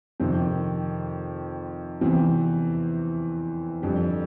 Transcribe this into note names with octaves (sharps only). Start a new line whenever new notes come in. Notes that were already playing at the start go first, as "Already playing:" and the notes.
F2 C3 D#3 C4
E2 C3 E3 C4
F2 D3 G3